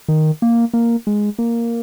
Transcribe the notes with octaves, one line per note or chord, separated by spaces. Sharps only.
D#3
A#3
A#3
G#3
A#3